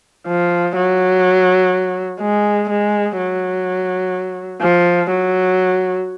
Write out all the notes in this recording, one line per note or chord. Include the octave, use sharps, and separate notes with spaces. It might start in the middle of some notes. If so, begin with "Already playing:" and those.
F3
F#3
G#3
G#3
F#3
F3
F#3